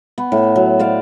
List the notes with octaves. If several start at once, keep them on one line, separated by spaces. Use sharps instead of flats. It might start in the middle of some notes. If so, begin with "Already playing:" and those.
B3
A2
F#3
C5 D5 F5